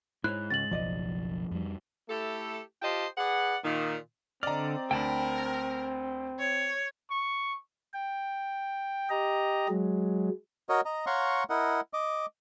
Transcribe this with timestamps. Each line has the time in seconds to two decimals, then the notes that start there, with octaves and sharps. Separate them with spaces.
0.24 G#2 E4 C5 C#5 F#6
0.50 C#2 C#4 A6 F#7
0.71 F#1 B1 F3 D5 D#5
1.51 F2 G3
2.09 A3 E4 G4 A4
2.82 F4 G4 C5 D#5 G5 A5
3.17 G#4 B4 D5 F#5
3.64 A#2 D#3
4.43 D3 C4 D5 D#5 A#5 F6
4.91 D2 D4 A#4 G5 A5 B5
6.39 C#5
7.10 C#6
7.94 G5
9.10 G4 D#5 A#5
9.69 F#3 G#3
10.69 F#4 A#4 C#5 D#5
10.85 D#5 A#5
11.06 C#5 F5 F#5 A#5 C6 C#6
11.50 E4 A#4 D#5 F#5
11.93 D#5 D6